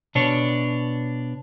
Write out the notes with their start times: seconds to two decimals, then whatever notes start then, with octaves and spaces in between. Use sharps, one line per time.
0.15 B2 D4 C#5